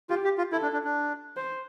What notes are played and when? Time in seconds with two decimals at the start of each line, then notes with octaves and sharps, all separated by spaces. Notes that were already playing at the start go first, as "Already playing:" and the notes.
0.09 F4 G4
0.24 G4
0.38 F4
0.52 E4 A4
0.63 D4
0.73 D4
0.84 D4
1.36 C5